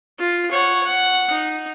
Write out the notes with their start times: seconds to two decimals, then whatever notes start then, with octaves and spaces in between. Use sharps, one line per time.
0.19 F4
0.51 C#5 F#5
0.85 F#5
1.30 D#4